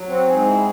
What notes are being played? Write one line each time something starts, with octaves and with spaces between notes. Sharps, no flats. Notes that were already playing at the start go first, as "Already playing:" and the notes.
Already playing: F#3
C4 F#4
G#2 G#4
E4